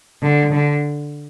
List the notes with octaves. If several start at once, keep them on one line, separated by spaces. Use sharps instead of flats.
D3
D3